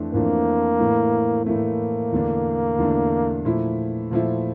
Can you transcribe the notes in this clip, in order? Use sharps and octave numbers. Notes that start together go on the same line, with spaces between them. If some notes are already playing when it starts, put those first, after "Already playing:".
Already playing: F2 E3 A3 D4
F2 E3 A3 A#3 D4
A2 E3 A3
A2 E3 A3 A#3
E2 D3 A3 D4
E2 D3 A3 D4
A#2 F3 A3 E4
A#2 F3 A3 E4